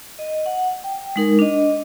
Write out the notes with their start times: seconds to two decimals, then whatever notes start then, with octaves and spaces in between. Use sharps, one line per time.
0.19 D#5
0.46 F#5
0.84 G5
1.16 G#3 D#4 A#4
1.39 D4 D#5